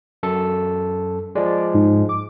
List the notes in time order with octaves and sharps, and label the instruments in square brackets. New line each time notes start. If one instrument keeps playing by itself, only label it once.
[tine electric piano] F#2 A4
[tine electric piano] F3 G#3 [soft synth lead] D5
[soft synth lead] G#2
D6